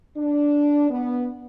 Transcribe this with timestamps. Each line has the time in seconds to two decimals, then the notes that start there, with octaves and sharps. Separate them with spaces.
0.17 D4
0.91 B3